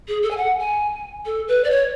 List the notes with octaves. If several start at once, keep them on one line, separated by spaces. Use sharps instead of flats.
G#4
A4
G#5
F#5
G#5
A4
B4
D5
C#5